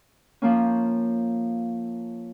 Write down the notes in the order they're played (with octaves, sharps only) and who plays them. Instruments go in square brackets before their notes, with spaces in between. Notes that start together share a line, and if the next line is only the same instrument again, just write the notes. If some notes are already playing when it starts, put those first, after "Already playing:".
[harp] F3 A#3 C#4